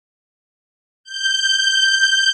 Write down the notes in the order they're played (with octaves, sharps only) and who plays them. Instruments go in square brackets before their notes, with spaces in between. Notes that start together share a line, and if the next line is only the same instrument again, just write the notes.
[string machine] G6